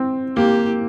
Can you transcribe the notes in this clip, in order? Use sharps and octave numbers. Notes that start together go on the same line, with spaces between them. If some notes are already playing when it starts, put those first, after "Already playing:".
Already playing: C4
A#3 G4